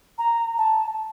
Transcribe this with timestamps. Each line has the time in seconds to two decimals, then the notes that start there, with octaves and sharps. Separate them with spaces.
0.18 A#5
0.58 A5